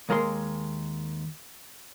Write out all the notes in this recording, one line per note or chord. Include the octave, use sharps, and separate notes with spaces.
D#2 G#3 A#4 F#5 C6